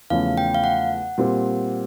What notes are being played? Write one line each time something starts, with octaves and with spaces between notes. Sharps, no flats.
E2 C#3 F3 A3 C#4 F5
G5
F5
F#5
A#2 G3 C4